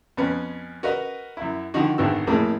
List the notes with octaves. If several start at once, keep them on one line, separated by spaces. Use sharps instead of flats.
F2 B3 C#4
F#4 A#4 B4 D#5
F#2 E4
D3 D#3 F3 D#4 F#4
G#1 D3 D#3 B3 F#4 E6
A1 F2 A2 A#3 G#4